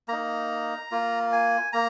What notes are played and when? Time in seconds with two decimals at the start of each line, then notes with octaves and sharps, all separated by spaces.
0.08 A#3 D#4 A#5
0.92 A#3 F4
1.32 G#5
1.73 A#3 A#5